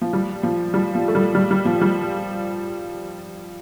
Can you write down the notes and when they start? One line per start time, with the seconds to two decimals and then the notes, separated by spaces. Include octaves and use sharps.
0.01 F3
0.13 G3
0.43 F3
0.74 G3
0.95 F3
1.08 A3
1.15 G3
1.35 G3
1.51 G3
1.65 F3
1.81 G3